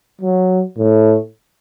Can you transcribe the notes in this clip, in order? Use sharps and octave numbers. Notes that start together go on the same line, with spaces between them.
F#3
A2